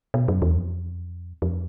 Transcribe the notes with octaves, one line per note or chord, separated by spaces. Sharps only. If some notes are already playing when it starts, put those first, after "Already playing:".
B2
F#2
E2
F2
F2